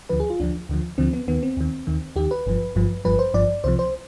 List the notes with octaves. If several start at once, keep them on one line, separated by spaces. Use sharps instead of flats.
D2 D3 F3 B4
G#4
F4
D2 D3 F3 D4
D2 D3 F3
D2 D3 F3 C4
B3
D#2 D#3 B3
C4
D#2 D#3
D#2 D#3
D#2 D#3 G4
B4
G1 G2 F3
G1 G2 F3
G1 G2 F3 B4
C5
G1 G2 F3 D5
C2 C3 F3 C5
C5